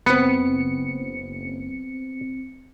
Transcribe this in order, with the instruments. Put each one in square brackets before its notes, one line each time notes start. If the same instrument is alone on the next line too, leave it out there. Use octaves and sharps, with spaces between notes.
[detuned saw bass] F#1 [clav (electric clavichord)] B3 [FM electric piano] C4 C#7